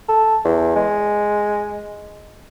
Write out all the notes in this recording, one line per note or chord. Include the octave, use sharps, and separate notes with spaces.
A4
E2
G#3